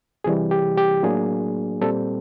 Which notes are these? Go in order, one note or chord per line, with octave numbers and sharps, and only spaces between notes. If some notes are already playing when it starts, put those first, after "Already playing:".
C2 C3 E3 G3 G#4
G4
G4
A2 F#3 A#3 D4 G#4
A#2 G3 C4 A4